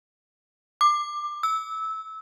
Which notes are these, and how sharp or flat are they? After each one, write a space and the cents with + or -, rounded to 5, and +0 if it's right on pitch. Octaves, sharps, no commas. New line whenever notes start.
D6 +20
E6 -20